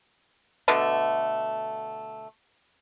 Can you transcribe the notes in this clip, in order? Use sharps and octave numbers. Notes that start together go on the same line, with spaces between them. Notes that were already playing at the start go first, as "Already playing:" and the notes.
B2 D3 A3